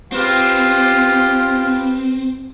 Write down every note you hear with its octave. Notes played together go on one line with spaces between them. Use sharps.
C4 F4 G4 B4